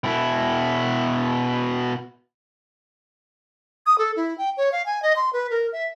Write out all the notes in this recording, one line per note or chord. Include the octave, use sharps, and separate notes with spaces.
B2 E4
D#6
A4
E4
G5
C#5
F5
G#5
D#5
C6
B4
A#4
E5